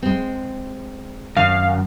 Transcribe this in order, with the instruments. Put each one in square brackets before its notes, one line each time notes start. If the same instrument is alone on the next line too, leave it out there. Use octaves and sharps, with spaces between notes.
[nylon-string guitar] G#3 C4
[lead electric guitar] F#2 [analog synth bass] D#3 [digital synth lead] F5